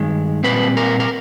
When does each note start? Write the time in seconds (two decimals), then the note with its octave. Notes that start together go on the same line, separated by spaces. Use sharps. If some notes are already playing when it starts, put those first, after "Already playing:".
Already playing: G2 D#3 G#3
0.44 A#2 G3 C4 B4
0.77 A#4
1.00 A#4